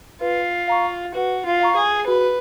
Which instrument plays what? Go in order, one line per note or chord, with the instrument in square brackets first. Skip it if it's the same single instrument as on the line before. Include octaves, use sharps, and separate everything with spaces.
[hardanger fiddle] F4 [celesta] B4
[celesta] F5 A#5 C#6
[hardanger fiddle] F#4 [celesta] B4
[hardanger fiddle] F4
[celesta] F5 A#5 C#6
[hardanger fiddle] G#4
[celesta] F#4 [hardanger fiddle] B4